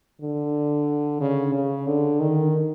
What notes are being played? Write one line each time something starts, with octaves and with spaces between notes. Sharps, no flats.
D3
C#3
C#3
D3
D#3